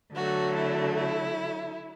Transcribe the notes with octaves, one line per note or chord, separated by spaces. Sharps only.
D3 F#3 A3 F#4
E4
E4